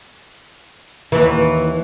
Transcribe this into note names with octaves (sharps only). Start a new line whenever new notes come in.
D#2 E3